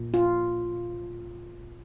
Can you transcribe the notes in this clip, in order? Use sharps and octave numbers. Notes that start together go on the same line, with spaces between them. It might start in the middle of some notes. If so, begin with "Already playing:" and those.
Already playing: A#2
F4